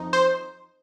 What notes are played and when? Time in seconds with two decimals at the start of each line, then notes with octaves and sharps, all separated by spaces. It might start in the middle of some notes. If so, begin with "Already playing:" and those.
Already playing: F2 F3 D#4
0.13 C5